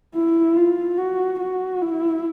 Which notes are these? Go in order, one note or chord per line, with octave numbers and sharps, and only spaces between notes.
E4
F4
F#4
F#4
E4